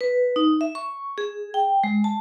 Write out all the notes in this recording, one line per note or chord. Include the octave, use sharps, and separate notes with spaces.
B4
D#4
E5
C#6
G#4
G5
G#3
A5